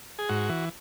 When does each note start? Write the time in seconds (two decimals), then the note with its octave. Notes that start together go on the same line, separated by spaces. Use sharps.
0.19 G#4
0.29 G#2 F#4
0.49 E3